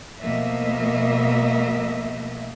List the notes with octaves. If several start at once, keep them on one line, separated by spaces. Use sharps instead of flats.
B2 F3 A3 A#3 D#5 E5